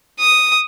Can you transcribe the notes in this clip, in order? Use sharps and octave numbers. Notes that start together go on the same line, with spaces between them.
D#6